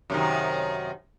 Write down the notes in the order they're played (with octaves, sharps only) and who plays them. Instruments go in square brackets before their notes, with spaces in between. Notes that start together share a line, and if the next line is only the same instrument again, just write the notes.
[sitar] F#2 C3 D#3